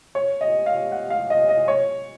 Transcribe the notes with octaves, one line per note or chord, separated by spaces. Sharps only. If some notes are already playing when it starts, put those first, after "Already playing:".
C#5
D#5
F5
F#5
F5
D#5
D#5
C#5